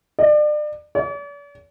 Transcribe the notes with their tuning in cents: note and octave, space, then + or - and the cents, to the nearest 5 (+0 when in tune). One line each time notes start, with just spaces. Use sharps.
D5 +35
D5 -45